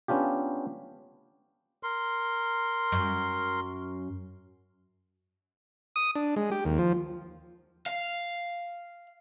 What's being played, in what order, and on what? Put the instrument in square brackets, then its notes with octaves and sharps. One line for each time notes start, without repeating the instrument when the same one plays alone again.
[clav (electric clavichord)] B3 C#4 D4 F4 G4
[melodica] A#4 C6
[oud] F#2
[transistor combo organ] D#6
D4
G#3
G4
D#2
F3
[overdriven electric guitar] F5